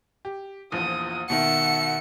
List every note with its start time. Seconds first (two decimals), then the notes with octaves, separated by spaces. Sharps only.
0.25 G4
0.72 A#1 E2 F3 D#6
1.30 B2 D#3 E5 F#5 C#7